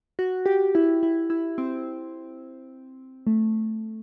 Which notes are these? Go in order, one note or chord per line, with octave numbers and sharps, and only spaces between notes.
F#4
G4
E4
E4
E4
C4
A3